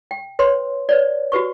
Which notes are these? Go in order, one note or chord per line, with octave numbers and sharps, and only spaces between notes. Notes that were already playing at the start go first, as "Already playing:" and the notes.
G5
B4 C#5 C6
B4 C#5 D5
F#4 G4 B4 C#6